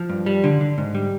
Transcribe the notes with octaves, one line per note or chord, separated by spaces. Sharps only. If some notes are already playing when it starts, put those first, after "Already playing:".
Already playing: F3
G2
G3
D3
D3
G#2
G3